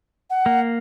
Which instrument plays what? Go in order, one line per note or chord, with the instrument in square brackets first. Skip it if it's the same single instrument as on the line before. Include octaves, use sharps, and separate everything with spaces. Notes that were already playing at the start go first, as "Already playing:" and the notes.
[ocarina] F#5
[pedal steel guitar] A#3